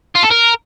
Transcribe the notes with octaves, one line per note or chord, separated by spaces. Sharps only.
F4
A4
A#4